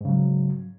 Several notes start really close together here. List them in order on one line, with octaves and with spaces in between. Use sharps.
G#2 C#3 F#3